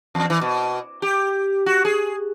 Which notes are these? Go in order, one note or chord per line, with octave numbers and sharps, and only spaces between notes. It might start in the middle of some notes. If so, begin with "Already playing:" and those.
E2
E3
B2
G4
F#4
G#4